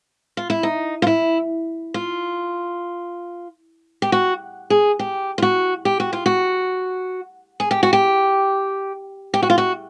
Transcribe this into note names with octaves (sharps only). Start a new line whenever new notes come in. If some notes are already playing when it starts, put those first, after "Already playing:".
F4
E4
D#4
F4
E4
F4
G4
F#4
G#4
G4
F4
F#4
G4
F#4
F4
F#4
G#4
G4
F#4
G4
G4
F#4
F4
F#4